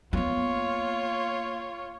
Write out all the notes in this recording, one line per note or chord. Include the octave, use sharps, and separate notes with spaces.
A#3 B3 F4 C#5